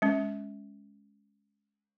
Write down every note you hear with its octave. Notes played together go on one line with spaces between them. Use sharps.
G#3 C#4